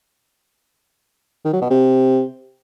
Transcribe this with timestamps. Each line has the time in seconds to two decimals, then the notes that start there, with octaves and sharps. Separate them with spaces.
1.45 D#3
1.53 F#3
1.62 B2
1.70 C3